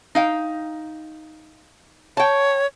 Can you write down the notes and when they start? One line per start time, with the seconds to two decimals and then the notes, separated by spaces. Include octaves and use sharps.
0.15 D#4 F5 G5
2.17 C#5 G5 A5